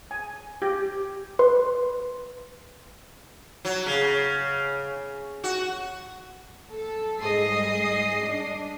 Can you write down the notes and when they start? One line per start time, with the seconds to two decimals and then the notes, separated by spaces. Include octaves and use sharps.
0.11 G#5
0.62 G4
1.39 B4 C6
3.65 F#3
3.86 C#3
5.44 F#4
6.73 A4
7.20 G#2 G3 G#4 D#5 D#6 C7
8.25 D4